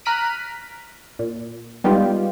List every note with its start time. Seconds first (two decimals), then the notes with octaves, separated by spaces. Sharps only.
0.05 A#5 F6 F#6 B6 D7 D#7
1.19 A#2
1.84 G3 G#3 B3 D#4 F4 G4